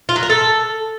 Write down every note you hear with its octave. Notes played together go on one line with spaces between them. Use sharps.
F4
F#3
A#4
A4